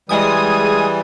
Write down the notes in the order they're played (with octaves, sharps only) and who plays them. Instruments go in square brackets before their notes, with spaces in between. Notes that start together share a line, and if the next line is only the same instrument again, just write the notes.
[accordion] E3 G3 [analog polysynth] G#3 G#5 D#6